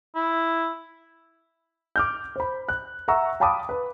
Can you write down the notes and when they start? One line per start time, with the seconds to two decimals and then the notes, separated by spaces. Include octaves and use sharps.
0.15 E4
1.96 D6 F6 G6
2.36 C5 B5
2.69 F#6
3.08 E5 F#5 A#5 C#6 E6
3.40 F5 G5 A5 B5 D6 D#6
3.69 B4